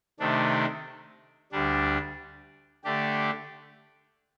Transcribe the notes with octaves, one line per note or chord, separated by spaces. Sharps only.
C3 D#3 A3 D4
D2 D3 G3 D4
D3 A3 D4 G4